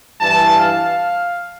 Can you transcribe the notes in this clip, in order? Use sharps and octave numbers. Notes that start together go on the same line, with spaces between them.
G2 E3 A5
F5